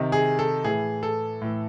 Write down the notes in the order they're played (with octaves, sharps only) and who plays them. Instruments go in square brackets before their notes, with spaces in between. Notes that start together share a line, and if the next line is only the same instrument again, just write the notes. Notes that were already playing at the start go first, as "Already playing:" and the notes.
Already playing: [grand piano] C3 D#3
G#4
A4
A2 E3 G#4
A4
A2 E3